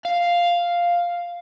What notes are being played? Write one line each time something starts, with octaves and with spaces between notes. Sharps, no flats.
F5